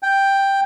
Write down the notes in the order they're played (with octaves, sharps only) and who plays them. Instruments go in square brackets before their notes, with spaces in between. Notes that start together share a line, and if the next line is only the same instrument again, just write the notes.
[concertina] G5